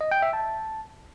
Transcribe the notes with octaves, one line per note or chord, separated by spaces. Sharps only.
D#5
G5
E5
A5